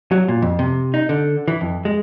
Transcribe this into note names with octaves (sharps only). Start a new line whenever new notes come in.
F#3
A#2
F2
C3
D#4
D3
E3
F2
G#3